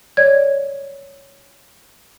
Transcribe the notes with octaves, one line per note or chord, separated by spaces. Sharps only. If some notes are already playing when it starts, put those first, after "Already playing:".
C#5 D5 G#6